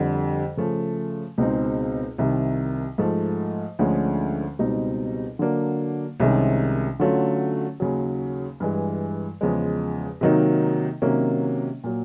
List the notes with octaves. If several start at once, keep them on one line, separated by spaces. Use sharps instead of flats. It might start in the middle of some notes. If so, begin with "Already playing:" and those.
Already playing: F2 D3 G3
C#3 F3 A3
C#2 B2 G#3 C4 D#4
C2 C3 D#3
G#2 F3 A3
D2 D3 F3 G#3 C#4
C#2 B2 G3 C4 D#4
D3 F#3 A#3 D4
C2 C3 D#3 G#3 C#4
D3 F#3 A3 C#4 F4
D#2 C#3 F#3
G2 E3 G#3
E2 C#3 F3 G#3
C3 D#3 F#3 A#3 D#4
C3 D#3 F#3 A#3 C#4
A#2 F#3